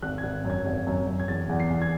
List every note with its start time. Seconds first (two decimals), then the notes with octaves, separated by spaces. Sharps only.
0.02 G#1 F#6
0.18 G#6
0.23 G#1
0.45 F#2
0.50 G#6
0.66 G#1
0.87 F#2
1.07 F#2
1.20 G#6
1.28 E2 A6
1.49 E2
1.60 C7
1.70 E2
1.82 G#6